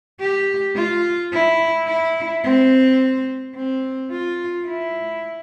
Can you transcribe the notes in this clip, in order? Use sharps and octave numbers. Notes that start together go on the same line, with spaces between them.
G4
F4
E4
E4
C4
C4
F4
E4